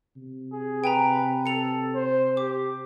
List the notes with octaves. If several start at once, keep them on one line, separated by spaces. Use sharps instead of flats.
C3
G#4
B4 G5 G#5 A#5
A4 C#7 F7
C5
G4 D6